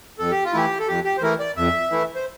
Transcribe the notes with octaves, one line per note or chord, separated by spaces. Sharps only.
F2 A4
G4
F4
E3 A3 E4 G4
A4
F2 G4
G4
C5
E3 A3 E4 A#4
D5
F2 E5
E3 A3 E4
C5